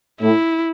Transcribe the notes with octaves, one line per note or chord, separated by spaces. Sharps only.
A2 E4